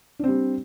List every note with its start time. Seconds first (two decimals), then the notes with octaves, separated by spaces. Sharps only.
0.19 D4
0.24 C4
0.28 G3